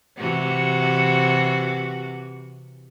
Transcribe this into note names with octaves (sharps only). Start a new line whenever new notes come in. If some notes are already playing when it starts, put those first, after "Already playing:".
C3 E3 F#4